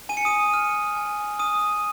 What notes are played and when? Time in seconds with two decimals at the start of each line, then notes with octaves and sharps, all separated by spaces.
0.09 G#5 D#7
0.17 C#7
0.25 D#6 D#7
0.54 F6
0.97 G#5
1.39 D#6 F6 D#7